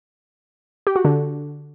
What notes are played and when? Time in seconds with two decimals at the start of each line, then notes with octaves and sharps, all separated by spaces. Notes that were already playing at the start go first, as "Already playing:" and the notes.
0.87 G4
0.96 F#4
1.05 D3